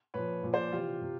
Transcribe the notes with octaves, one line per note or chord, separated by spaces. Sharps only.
A#2 F3 B4 C#5
A#2 F3
C5 D5
C3 E3 F4 G4
C3